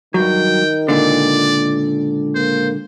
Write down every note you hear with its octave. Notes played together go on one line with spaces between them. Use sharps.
G2 D#3 F#3 G5
C#2 A#2 D3 D5
A#3 C5